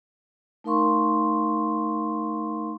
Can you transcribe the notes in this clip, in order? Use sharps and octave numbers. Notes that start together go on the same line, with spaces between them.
A3 D#4 A#4 F5 C6 C#6